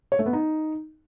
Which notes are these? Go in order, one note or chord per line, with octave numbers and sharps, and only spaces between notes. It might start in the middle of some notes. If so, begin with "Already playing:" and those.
C#5
A3
B3
D#4